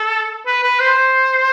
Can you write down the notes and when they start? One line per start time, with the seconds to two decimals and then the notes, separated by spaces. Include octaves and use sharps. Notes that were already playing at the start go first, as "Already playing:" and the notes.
Already playing: A4
0.46 B4
0.63 B4
0.80 C5